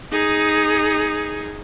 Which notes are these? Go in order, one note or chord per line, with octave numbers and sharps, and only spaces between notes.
D#4 G#4